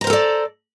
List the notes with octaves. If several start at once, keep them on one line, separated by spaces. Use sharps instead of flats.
A4 A#4 C5 D5 A#5